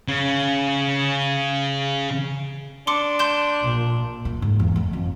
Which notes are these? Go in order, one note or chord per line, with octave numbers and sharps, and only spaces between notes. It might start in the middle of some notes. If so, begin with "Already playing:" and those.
C#3 C#4
D4 C6 D6 C#7
C6 G6 E7
A#1 A#2
A#3
G#2
E2
A3
F2